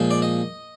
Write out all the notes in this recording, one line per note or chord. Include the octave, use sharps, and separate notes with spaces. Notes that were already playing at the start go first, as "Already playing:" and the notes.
Already playing: A#2 F3 G#3
D5
D#5